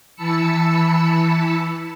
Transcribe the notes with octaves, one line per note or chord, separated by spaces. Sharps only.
E3 A5 B5 E6 C#7